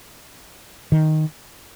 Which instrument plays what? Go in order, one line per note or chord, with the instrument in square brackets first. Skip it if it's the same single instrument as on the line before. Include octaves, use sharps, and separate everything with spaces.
[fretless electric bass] D#3